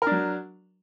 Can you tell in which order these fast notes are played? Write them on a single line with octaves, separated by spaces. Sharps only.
A#4 D4 F#3